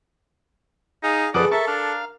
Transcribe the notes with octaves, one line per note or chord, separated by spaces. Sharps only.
D#4 G#4 F5
F2 G#4 A4 B4 D5 F#5 D6 D#6
A4 A#4 E5 A5 C#6
D4 F5